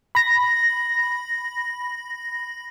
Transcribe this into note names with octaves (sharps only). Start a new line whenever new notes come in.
B5 A#6